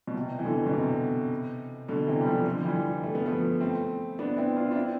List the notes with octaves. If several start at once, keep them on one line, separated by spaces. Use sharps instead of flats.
B2
C3
E3
B2 D3
B2
C3
B2 D3
C3 E3
G3
D3 F3
D3 F3
E3 G3
A3
B3
F3 A3
A3 C4
B3 D4
C4 E4
D4 F4
D4
C4 E4